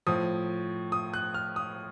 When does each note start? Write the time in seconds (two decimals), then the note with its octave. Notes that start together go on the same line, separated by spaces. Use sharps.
0.07 A2 F3 D#6
0.92 D#6
1.14 F#6
1.34 F6
1.56 D#6